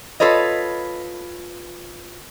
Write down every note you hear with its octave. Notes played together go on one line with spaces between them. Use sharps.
F4 A4 B4 C#5 D#5